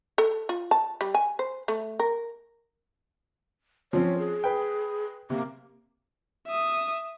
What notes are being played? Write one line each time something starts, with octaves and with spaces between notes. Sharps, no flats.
A4
F4
A5
G3
G#5
C5
A3
A#4
F3 C4 C#4 C#5
G#4
B4 G5
C3 A#3
E5 D#6